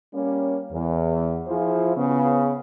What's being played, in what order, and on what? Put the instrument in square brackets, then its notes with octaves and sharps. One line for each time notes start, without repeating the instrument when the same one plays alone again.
[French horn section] G3 A#3 C#4
E2
F3 E4 F4 G#4 C5
C#3 B3